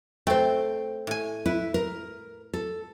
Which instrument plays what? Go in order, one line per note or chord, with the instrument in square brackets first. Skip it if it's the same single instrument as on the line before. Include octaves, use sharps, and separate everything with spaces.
[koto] A3 C4 [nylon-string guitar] C5 G5
[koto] A2 G#5
[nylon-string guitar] E4 [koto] B4
[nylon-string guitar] A#4
A4